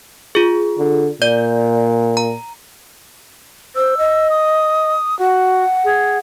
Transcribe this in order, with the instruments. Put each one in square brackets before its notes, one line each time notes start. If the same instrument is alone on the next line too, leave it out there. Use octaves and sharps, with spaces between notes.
[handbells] F4 G#4
[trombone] D3
[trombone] A#2 [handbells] D5 G6
[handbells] A#5
[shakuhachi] C5 [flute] E6
[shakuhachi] D#5
[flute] D#6
[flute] F#4 [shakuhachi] F#5
[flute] G#4